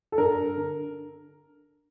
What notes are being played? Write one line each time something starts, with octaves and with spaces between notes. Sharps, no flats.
A4
G2 A#4
D3